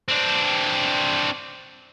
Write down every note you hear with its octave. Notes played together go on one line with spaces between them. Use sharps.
C4 D4